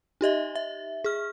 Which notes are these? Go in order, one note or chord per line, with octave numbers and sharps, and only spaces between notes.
D#4 G4 D#5 E5
E5
G#4 F6